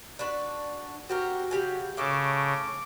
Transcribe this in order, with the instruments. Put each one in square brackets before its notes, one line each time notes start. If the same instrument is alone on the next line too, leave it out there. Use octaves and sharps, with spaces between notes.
[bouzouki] D4 F#4 B4
[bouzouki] C4 G4 A#4 [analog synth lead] F#4
[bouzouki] C#3 G4 G#5
[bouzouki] A2 A3 [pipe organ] C#3 [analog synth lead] D6